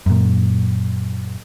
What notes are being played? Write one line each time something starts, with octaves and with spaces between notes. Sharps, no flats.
F#2 A#2